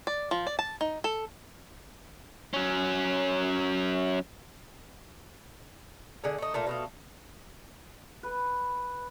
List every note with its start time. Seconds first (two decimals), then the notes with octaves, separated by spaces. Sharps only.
0.07 D5
0.31 F3
0.47 D5
0.59 A5
0.81 D#4
1.04 A4
2.53 F#3 C#4
6.24 D3 G#3
6.38 A3 D#4
6.54 A#2 A3 F4
6.67 B2 A3 F4
8.23 B4